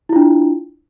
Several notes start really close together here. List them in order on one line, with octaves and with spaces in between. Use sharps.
E4 F4 D4